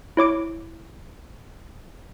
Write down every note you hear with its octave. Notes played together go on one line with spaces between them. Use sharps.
E4 C#5 D6 D7